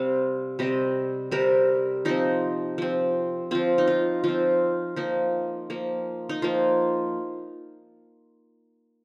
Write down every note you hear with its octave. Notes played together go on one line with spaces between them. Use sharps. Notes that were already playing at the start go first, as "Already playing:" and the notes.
Already playing: C3 G3 C4 F5
C3 G3 C4 D#5
C3 G3 C4 A#4
F3 C4 D#4
F3 C4
F3 C4 F4
D#4
F4
F3 C4 F4
F3 A#3 D#4
F3 A#3
D#4
F3 A#3 F4